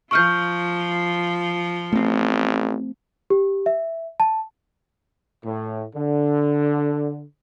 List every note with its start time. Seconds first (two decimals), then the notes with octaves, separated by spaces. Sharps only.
0.11 F3 F4 C#6 F6 G6
1.92 A1 A3 C4
3.30 G4
3.66 E5
4.20 A5
5.44 A2
5.95 D3